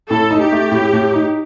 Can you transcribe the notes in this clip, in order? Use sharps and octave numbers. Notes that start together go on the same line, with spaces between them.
A2 A4
D#4
G4
A3
A2
A2
D#4